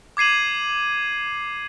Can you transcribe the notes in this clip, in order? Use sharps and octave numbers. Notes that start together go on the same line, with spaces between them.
D6 G#6 C7 D#7 F#7